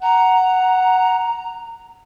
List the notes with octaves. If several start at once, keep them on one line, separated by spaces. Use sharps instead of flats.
F#5 A#5